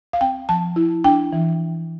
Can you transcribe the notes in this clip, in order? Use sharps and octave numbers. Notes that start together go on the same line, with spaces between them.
F5
C4 G5
F3 A5
E4
D4 G5
E3